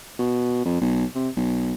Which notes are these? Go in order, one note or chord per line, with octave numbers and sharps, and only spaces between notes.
B2
F2
B1
C3
B1